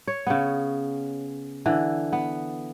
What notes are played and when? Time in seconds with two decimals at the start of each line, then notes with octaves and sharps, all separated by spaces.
0.07 C#5
0.27 C#3 B3
1.66 D3 E3
2.13 B3